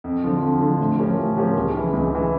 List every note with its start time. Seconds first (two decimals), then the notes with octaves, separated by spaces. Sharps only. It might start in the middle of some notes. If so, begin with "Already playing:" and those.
0.04 F2
0.24 D3 F3
0.42 F2
0.61 D3 F3
0.80 A2
0.99 F3 C#4 G4 A#4
1.18 A2
1.37 F3 C#4 G4 A#4
1.56 C#2
1.74 C#3 E3
1.94 C#2
2.12 C#3 E3